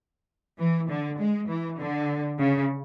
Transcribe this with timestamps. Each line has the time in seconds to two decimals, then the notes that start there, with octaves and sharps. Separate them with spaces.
0.59 E3
0.89 D3
1.19 G#3
1.48 E3
1.79 D3
2.39 C#3